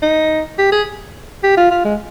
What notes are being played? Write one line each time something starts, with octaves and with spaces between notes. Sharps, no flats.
D#4
G4
G#4
G4
F4
F4
G#3